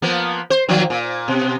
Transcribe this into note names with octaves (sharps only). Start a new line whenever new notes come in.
F3 A#3 B3
C5
D#3 F3 A#3
A#2
B2